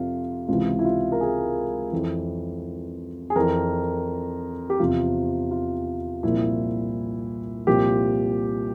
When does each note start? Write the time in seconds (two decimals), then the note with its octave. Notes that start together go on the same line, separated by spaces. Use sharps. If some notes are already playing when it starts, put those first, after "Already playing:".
Already playing: F2 C3 F4
0.48 C#2 C3 E3 F4
0.79 E4
0.85 F4
1.12 A#4
1.21 G#4
1.92 F2 E3
3.30 G#4
3.36 F2 E3 A#4
4.70 G4
4.79 E2 C3 F3 F4
5.51 F4
6.23 C2 A#2 F3 E4
7.67 C2 A#2 F3 G4